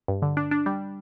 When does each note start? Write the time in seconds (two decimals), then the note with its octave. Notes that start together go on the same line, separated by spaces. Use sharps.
0.08 G2
0.22 D3
0.37 D4
0.51 D4
0.66 G3